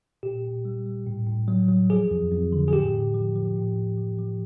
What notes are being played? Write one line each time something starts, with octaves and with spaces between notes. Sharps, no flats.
A#2 G4
A#2
G3
G3
A2
A2
F#3
F#3
F3 G#4
F2
F2
D3
G#4
A2 G4
A2
F3
F3
A2
A2
F3
F3